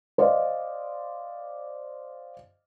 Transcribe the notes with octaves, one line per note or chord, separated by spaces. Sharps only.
C5 D5 D#5 F5